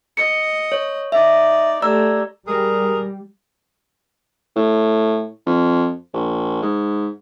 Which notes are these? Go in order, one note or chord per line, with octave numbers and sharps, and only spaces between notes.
D#5 C#7
C#5
D#4 D5 E5
A3 G4 D5 A#5 E6
G3 G#4 A#4
A2
F2
A#1
G#2